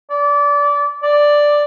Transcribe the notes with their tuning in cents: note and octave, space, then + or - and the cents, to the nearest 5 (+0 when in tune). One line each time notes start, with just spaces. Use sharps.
D5 -25
D5 +0